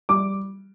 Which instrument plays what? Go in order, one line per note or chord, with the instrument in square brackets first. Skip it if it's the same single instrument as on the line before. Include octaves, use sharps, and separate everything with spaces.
[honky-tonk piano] G3 D6